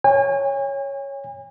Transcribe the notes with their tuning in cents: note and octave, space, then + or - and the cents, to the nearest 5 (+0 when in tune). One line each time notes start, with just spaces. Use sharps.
C#5 +0 G#5 -40